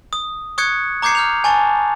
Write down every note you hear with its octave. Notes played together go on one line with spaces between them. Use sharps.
D#6
C#6 D#6 F#6 G#6 C#7
A#5 D6 G6 G#6 C7 C#7
F6 G6 F7
G#5 A5 C#6 A6